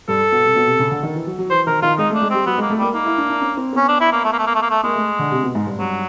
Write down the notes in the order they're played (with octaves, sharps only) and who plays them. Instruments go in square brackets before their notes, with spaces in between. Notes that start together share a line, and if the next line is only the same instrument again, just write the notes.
[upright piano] G2 [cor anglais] A4
[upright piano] B2
C3
B2
C3
C#3
D3
D#3
E3
F#3
F#3
[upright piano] E3 [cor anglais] C5
[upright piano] D#3 [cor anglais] A#4
[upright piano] D#3 [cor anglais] F4
[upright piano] G#3 [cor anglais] D#4
[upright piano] A3 [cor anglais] D4
[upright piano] G#3
[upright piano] G3 [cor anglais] C4
[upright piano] F#3 [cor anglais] B3
[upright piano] G#3 [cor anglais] A#3
[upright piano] A3
[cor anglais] G3 [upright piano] A#3
[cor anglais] A#3 [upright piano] D#4
[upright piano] E4
D4
D4
C#4
C4
[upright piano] B3 [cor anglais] C#4
[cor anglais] D4
E4
A#3
A3
A#3
A3
A#3
A3
A#3
A3
[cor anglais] G#3 [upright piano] A#3
[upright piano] A3
D3
C3
B2
G#2
G2
[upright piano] G2 [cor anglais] F#3